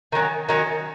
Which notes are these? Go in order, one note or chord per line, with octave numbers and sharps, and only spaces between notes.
D#3 F#3 C#4
D#3 F#3 C#4